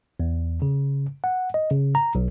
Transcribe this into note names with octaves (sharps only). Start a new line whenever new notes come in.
E2
C#3
F#5
D#5
C#3
A#5
B1